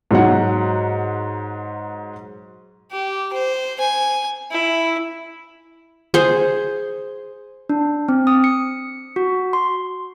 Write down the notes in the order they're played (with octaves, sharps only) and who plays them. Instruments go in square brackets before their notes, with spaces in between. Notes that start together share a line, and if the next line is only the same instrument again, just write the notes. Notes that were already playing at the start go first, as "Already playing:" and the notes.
[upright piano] G#2 F#3 F#5
[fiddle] G4
C5
G#5
E4
[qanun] G#4 C5
[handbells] D4
C4
D#6
C#7
F#4
C6